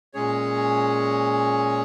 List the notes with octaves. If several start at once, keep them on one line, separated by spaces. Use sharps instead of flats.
A#2 G#3 C#4 G#4 C#5